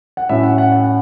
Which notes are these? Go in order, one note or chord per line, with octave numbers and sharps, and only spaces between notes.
F#5
A2 F#3 C#4 E5
F#5
F#5
F#5
F#5